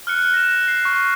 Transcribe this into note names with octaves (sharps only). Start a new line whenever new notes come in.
F6 F#6 C#7
A#6 E7
C7
C#6